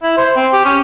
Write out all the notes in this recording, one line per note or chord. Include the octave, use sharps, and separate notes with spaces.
E4
C5
C4
G4
C#4